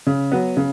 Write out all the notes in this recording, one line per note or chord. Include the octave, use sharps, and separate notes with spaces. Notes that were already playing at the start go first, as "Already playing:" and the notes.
C#3
F#3 B3
C#3